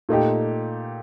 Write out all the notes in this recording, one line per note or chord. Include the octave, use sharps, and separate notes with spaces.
A#2 A3 D#4 G4